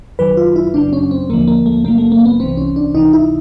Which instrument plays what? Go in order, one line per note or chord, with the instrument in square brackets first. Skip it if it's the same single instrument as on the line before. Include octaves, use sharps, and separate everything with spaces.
[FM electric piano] G1 F#2 D#3 F#3 B4
F4
E4
G1 F#2 C#3 F#3 D4
C#4
C4
D#2 D3 F3 A#3
A#3
A3
F#2 C#3 F#3 A#3
A3
A#3
B3
C2 C3 E3 C4
C#4
D4
C#2 C3 E3 D#4
E4